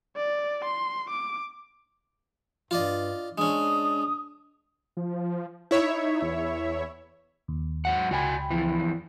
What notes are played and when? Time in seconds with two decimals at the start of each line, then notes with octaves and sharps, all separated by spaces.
0.16 D5
0.65 C6
1.10 D6
2.71 G2 F4 D5 D#5
3.38 G#3 C#4 D4 D#6
4.97 F3
5.71 D#4 E4 C#5 E5
6.22 E2
7.48 D#2
7.85 G#2 F#3 F#5
8.11 C#2 F#4 D5 G5 G#5 B5
8.50 F2 E3